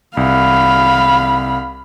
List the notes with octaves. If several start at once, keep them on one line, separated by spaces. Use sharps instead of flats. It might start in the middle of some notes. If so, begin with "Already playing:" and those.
C2 F5 B5